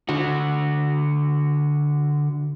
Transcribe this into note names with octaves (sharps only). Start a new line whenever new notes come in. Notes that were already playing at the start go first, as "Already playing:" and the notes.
D3 F#4